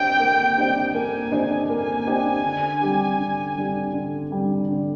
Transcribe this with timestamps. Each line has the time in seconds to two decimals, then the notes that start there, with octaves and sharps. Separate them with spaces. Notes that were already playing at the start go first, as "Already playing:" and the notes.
Already playing: D4 G4 C5 D#5 G5
0.19 A#3
0.58 D4 G4 C5 D#5
0.95 A#3 G#5
1.32 D4 G4 C5 D#5
1.70 A#3 G#5
2.07 D4 G4 C5 D#5
2.44 D3
2.81 G3 D4 G4
3.19 D3
3.57 G3 D4 G4
3.93 D3
4.31 G3 D4 G4
4.69 D3